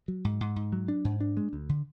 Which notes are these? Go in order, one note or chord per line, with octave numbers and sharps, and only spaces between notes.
F#3
G#2
G#2
G#2
F#3
D4
G#2
D4
G#3
D2
D3